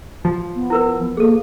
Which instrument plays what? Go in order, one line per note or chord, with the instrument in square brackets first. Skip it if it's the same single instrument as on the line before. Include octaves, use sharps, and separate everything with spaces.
[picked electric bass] F3
[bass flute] B3
[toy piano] E4 A#4 B4
[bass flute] A#3 [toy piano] G#4 A4